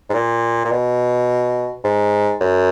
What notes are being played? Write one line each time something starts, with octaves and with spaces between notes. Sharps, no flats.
G#2
A#2
A#2
B2
G#2
F#2